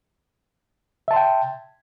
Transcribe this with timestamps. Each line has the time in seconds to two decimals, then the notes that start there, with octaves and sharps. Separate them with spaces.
1.08 E5
1.11 A5
1.14 C6
1.16 G5